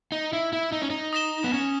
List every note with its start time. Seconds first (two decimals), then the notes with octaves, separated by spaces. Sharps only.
0.12 D#4
0.33 E4
0.53 E4
0.72 D#4
0.82 C#4
0.90 D#4
1.13 D#6 A#6 E7 G7
1.44 B3
1.54 C#4